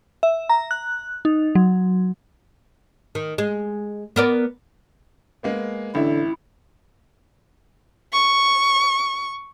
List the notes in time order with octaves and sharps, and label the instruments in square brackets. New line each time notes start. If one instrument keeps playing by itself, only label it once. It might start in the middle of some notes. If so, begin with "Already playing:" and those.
[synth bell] E5
A#5
F#6
D#4
F#3
[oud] D#3
G#3
B3 A#4 D5
[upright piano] G#3 A#3 B3
[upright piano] A1 E5 [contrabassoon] D3 [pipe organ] E4
[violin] C#6